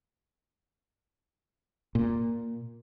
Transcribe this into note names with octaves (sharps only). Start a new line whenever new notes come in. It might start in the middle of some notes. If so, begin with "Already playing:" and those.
A#2